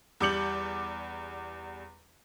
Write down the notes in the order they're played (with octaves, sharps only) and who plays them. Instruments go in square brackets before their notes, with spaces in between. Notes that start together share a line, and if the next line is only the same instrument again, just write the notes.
[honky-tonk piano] E2 G3 D6 G6 C#7 F#7